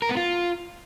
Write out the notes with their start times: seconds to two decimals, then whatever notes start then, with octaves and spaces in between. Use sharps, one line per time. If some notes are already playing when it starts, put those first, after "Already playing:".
0.02 A#4
0.09 B3
0.17 F4